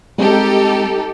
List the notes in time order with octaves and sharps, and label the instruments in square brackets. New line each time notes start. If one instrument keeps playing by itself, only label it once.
[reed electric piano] G3 G#3 C4 [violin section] D#4 G4 A4